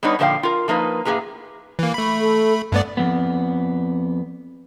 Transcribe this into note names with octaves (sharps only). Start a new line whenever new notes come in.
G3 B3 D4 D#4 B4 C#5
A#2 D3 F3 C5 F5 G5
F4 A#4
F3 A#3 D#4 B4
A2 A#3 C#4 G#4 B4 A#5
E3 A#3
A3 B5
A4
G2 A3 B3 D5
F2 B3